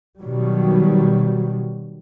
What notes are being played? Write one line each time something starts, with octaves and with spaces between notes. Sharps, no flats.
B2 D#3 F#3 G3